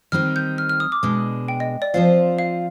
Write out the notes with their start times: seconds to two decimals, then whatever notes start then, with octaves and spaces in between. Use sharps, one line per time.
0.12 D#3 G3 C4 D#4 G4 F6
0.36 G6
0.58 F6
0.69 F6
0.80 D#6
0.92 D6
1.03 B2 G#3 D4
1.48 G5
1.60 D#5
1.82 D5
1.94 F3 C4 F4 C5 F5
2.39 F5